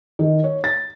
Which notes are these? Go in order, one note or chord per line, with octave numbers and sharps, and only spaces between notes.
D#3
C#5
A6